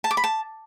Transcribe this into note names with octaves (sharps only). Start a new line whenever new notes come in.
A5
D6
B5
A5